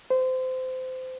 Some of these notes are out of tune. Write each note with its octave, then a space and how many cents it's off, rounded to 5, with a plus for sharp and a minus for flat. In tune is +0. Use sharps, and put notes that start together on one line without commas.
C5 -25